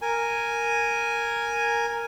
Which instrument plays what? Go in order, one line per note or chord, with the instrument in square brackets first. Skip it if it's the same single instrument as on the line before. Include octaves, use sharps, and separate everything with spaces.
[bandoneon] A#4 G#5